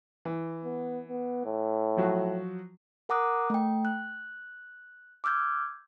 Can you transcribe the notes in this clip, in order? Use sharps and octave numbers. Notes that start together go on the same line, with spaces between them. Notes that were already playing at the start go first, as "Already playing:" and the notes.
E3
B3
B3
A2
F3 F#3 F#4
A#4 F#5 A#5 D6 D#6 F#6
A3 G5
F#6
D6 E6 F6 G6 G#6